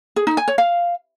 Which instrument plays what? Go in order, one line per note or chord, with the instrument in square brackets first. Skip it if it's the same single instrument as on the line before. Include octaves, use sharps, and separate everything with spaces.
[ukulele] G#4
D#4
G#5
C#5
F5